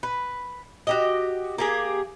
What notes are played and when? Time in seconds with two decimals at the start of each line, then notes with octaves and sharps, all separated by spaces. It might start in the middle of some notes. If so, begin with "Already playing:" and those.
0.03 B4
0.87 F#4 G4 D#5
1.58 A#3 G4 G#4